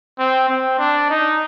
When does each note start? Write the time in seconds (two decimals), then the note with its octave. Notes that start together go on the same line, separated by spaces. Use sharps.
0.19 C4
0.49 C4
0.79 D4
1.10 D#4